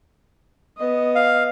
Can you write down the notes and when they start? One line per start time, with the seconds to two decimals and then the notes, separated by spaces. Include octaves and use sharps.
0.78 B3 D#5
1.15 F5